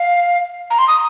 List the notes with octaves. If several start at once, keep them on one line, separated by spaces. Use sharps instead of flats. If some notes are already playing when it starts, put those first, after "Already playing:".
Already playing: F5
A#5
C6
D#6